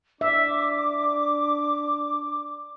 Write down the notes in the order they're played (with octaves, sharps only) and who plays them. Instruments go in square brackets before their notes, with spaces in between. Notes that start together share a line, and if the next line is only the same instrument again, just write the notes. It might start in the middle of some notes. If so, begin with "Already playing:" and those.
[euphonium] D4 [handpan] E5 [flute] D6